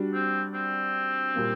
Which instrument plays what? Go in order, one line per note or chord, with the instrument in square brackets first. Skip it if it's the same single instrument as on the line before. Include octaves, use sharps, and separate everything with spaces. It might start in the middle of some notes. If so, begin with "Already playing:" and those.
Already playing: [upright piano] G3 D4 F#4
[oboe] C4
C4
[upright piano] A#2 G3 A#3